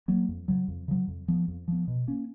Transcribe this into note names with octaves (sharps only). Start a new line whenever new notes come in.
F#3 A#3
F2
C#3 F#3
F2
C#3 F#3
F2
F3 B3
F2
F3 B3
B2
A#3 C#4